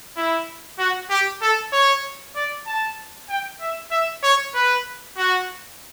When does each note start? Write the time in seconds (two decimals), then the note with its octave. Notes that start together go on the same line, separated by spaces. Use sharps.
0.17 E4
0.79 F#4
1.10 G4
1.41 A4
1.73 C#5
2.35 D5
2.66 A5
3.29 G5
3.61 E5
3.91 E5
4.23 C#5
4.55 B4
5.17 F#4